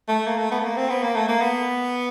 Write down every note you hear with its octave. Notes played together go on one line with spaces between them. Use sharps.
A3
A#3
A3
B3
A3
A#3
C4
B3
A#3
A3
A#3
B3